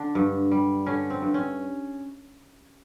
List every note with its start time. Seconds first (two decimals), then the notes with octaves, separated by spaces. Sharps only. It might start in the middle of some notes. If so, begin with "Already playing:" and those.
Already playing: D3 D4
0.15 G2
0.51 G3
0.86 D3 C#4
1.10 C4
1.22 G2
1.34 C#4